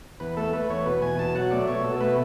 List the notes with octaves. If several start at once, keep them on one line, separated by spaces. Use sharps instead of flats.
E2 B4
A3 A4
A3 B4
E2 C#5
B2 B4
E2 G#5
B2 A5
F#3 F#5
A3 D5
B2 C#5
B2 A4
A4
A3 B4